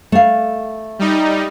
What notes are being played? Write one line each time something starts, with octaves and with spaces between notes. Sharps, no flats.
A3 F5
G3 D#4